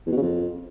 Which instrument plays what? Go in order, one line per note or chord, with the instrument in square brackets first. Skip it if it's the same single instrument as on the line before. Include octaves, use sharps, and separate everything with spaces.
[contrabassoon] E2
B2
C#3
F2